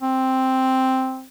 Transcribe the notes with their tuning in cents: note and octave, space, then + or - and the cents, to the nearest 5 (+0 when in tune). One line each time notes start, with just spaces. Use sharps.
C4 +0